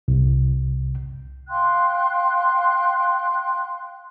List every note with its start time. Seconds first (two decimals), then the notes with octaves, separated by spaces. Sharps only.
0.08 C2
1.49 F5 G5 C6 F#6